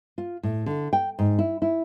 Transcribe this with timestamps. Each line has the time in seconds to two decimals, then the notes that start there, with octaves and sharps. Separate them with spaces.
0.18 F4
0.43 A2
0.66 D3
0.93 G5
1.19 G#2
1.39 E4
1.62 E4